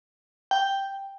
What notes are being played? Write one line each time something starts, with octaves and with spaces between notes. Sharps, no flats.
G5